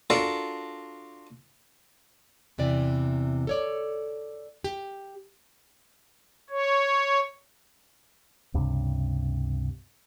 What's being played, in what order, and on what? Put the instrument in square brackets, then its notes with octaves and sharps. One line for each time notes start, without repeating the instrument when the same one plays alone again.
[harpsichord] D4 F4 F#4 A4 A#4 D5
[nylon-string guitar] E2 C3 E3 D5
A4 C#5 D5
G4
[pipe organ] C#5
[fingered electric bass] C#2 G2 C3